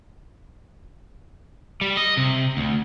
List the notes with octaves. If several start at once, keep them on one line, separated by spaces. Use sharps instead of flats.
G3
D#5
C3
D2